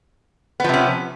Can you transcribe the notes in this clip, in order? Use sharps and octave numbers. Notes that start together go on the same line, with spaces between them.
C3 F3 B3 C#4